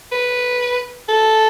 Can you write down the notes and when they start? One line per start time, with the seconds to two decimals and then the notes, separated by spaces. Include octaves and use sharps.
0.12 B4
1.08 A4